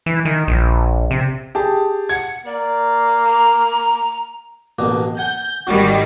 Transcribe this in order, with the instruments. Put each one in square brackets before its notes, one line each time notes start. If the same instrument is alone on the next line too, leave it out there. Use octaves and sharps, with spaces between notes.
[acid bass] E3
D#3
A#1
C3
[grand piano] G4 G#4 A5
[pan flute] F#5 [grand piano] G#6
[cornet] A#3 [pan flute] D5
[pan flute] A#5
[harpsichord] A1 B2 A#3
[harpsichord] F#5 G#5 [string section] G6
[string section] G#1 D#3 G3 [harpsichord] F#4